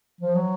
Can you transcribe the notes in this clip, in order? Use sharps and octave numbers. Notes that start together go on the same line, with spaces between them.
F3
F#3